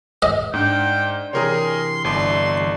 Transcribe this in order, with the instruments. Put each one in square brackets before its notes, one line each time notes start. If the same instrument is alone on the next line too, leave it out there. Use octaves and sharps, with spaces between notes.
[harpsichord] D#5
[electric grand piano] G#2 [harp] D4 F#6 [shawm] G5
[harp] C3 E3 [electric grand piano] G#4 A#4 C#5 [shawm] C6
[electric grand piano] G1 [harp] D5 E5 A5 [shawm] C6